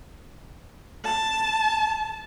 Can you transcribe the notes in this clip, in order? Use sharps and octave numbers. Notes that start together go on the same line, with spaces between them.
A5